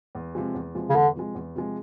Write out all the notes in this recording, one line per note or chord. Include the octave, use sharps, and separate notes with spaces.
E2
C3 F3 G#3
E2
C3 F3 G#3
C#3
E2 D3
C3 F3 G#3
E2
C3 F3 G#3